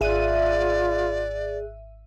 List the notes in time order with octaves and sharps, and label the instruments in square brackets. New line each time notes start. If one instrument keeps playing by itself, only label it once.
[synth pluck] G#1 E5 D#7 [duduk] F4 [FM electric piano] G#4 F#6 [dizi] D5